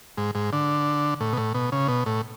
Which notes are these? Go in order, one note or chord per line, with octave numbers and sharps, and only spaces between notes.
G#2
G#2
D3
A2
B2
A2
B2
C#3
B2
A2